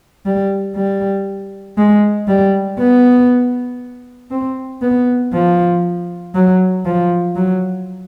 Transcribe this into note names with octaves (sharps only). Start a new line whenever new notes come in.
G3
G3
G#3
G3
B3
C4
B3
F3
F#3
F3
F#3